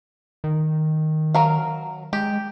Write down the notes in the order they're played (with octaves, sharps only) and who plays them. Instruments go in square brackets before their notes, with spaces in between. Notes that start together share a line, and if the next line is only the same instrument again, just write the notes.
[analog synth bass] D#3
[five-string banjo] F#3 A#4 F5
[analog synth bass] G#3 [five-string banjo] G4